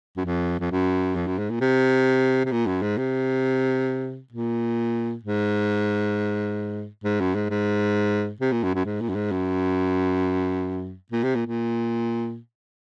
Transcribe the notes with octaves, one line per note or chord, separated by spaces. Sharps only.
F#2
F2
F2
F#2
F2
F#2
G#2
A#2
C3
C3
A#2
F#2
G#2
C3
A#2
G#2
G#2
F#2
G#2
G#2
C3
A#2
F#2
F#2
G#2
A#2
F#2
G#2
F#2
A#2
C3
A#2
A#2